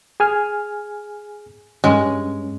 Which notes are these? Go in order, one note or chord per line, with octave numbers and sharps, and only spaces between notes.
G#4 G#5 F6
G2 G#3 C#4